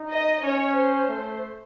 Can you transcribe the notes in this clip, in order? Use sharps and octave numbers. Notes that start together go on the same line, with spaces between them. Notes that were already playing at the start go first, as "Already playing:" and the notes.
Already playing: D#4
D#5
C#4 C#5
C5
A3